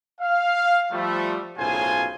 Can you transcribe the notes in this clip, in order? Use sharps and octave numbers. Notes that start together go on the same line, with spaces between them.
F5
F3 G3 A3
B1 A2 C#3 F4 C5 G#5